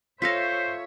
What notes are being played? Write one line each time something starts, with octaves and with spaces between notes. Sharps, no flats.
F4 A4 C5 C#5 E5 F5 A#6 B6